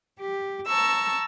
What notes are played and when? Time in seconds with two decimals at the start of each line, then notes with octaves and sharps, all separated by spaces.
0.18 G4
0.66 A5 A#5 C#6 E6